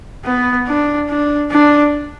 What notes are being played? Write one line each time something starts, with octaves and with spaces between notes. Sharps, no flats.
B3
D4
D4
D4